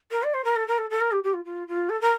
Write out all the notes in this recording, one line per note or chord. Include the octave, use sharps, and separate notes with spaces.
A#4
D5
C5
A#4
A4
A#4
A4
A4
A#4
G4
G4
F4
F4
F4
A4
A#4